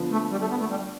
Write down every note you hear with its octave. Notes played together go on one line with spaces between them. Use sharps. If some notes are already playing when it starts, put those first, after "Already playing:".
Already playing: D3 F3 B3 F4
A3
G3
A3
B3
A3
G3